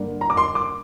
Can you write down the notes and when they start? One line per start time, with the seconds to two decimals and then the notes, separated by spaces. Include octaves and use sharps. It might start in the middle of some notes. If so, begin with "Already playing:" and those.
Already playing: G2 D3 A#3 D4
0.21 A#5
0.30 D6
0.37 C6
0.55 D6